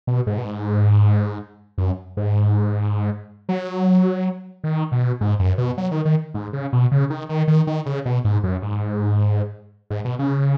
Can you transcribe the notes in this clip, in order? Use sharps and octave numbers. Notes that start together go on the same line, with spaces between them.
B2
G#2
B2
G#2
F#2
G#2
F#3
D#3
B2
G#2
F#2
B2
F#3
D#3
D#3
G#2
C#3
B2
C#3
D#3
D#3
D#3
D#3
C#3
B2
G#2
F#2
G#2
G#2
B2
C#3